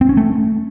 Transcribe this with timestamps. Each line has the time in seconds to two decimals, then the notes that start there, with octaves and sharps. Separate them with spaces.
0.01 C4
0.09 C#4
0.17 A3